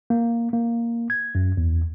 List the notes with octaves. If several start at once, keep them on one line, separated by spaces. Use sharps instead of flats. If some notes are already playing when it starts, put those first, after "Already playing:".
A#3
A#3
G#6
F#2
E2